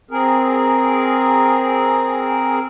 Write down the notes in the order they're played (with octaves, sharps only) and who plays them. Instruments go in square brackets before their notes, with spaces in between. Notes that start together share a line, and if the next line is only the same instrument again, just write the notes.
[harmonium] C4 G#4 A#4